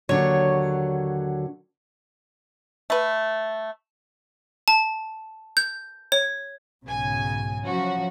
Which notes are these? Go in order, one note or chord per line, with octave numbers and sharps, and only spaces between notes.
D#2 D3 F#3 C#5
A3 B4
A5
G6
C#5
B1 G#2 C#3 G#5
F3 F#3 C#4 F#4